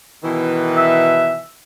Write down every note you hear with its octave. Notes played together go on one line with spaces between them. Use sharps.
B2 D#3 E3
E5